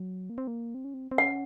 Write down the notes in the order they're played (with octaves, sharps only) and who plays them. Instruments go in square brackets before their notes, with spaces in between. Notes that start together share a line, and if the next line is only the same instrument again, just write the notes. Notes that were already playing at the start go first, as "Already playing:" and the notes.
Already playing: [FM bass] F#3
A#3
C4
A#3
C4
C#4
C4
C4
[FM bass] C#4 [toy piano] F#5